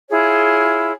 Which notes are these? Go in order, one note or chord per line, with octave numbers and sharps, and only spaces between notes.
E4 F4 G#4 C#5